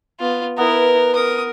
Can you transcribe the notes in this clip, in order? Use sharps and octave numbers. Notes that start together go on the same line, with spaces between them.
B3 F4
B3 E4 A#4
A#4 D#6